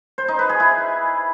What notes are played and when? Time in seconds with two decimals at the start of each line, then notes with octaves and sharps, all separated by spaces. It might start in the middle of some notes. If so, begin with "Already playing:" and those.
0.18 C5
0.28 D#4
0.39 B4
0.49 G#4
0.60 E4